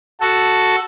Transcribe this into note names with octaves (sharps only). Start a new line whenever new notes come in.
F#4 A4